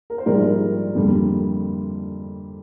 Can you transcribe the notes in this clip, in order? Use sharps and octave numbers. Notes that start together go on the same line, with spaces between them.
A#4
C5
A#1 G#2 G3 A#4 D5
F2 D3 G3 A#3